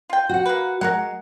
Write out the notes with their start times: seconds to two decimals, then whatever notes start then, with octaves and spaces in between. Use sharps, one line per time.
0.10 F4 G5
0.29 F#4 F#5
0.45 A#3 B4
0.81 G#3 F#4 A#4 F#5